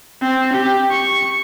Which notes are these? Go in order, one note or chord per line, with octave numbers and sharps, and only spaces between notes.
C4
G4
C#6